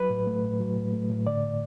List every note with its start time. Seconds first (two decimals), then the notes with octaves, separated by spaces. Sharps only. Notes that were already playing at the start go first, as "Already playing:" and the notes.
Already playing: F#3 B4
0.10 A2
0.27 A3
0.43 A2
0.60 F#3
0.76 A2
0.93 A3
1.10 A2
1.26 D3 D5